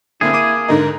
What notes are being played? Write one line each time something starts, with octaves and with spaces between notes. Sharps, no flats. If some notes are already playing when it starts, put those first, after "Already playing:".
D3 A#3 C4 E4 G#4
A#3 D6 D#7
G#2 D3 D#4 A#4